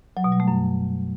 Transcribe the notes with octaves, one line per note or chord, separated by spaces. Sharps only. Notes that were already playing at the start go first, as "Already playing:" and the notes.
F#3
B2
G3
A3
F#2